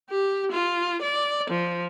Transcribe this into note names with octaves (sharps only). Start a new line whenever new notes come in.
G4
F4
D5
F3